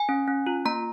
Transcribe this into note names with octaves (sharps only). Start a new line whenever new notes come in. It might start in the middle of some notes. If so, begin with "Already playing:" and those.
Already playing: G#5
C#4
C#4
F4
A#3 A#5